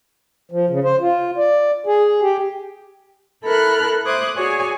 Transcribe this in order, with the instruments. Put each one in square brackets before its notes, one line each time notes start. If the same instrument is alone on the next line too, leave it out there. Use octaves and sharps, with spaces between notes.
[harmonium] F3
C#3
C5
F4
D5
G#4
G4
[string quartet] E4 A4 A#4 B5 F6 F#6
C5 E5 D6 D#6 F#6 G#6
F#4 G#4 C#5 D5 G#5